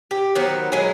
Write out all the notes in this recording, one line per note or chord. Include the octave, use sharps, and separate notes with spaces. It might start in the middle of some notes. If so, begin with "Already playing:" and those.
G4
D#3 F#3 B3 C5
F#3 G#3 E4 G#4